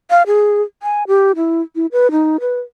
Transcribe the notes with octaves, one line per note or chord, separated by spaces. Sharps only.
F5
G#4
G#5
G4
E4
E4
B4
D#4
B4